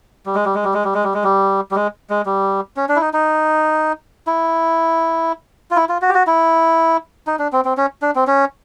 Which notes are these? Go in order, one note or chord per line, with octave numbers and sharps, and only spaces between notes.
G3
G#3
G3
G#3
G3
G#3
G3
G#3
G3
G#3
G3
G3
G#3
G#3
G3
C#4
D4
E4
D#4
D#4
E4
F4
E4
F4
F#4
G4
F#4
E4
D#4
D4
C4
C4
C#4
D4
C4
C#4